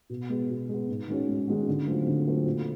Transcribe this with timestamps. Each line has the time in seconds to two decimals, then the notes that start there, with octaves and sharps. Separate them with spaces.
0.10 B2
0.30 G#3 B3
0.49 B2
0.69 G#3 B3
0.89 G#2
1.08 D#3 G#3 C#4 F#4
1.28 G#2
1.48 D#3 G#3 C#4 F#4
1.68 D3
1.86 F#3 A3 C4 F4
2.07 D3
2.26 F#3 A3 C4 F4
2.46 A#2